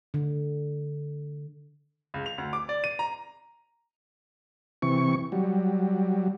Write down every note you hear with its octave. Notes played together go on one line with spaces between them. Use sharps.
D3
C#2
F7
D2
D6
D5
D#7
A#5
C3 E3 C#6
F#3 G3